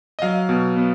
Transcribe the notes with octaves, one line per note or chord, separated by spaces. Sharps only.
D#5
F#3 F5
B2
B3